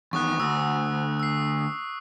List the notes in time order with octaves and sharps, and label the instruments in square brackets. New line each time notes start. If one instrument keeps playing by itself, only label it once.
[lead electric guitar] E2 D#3 [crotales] C#6 D#6 F#6
[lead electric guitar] D2 [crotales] E6
[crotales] E6 C7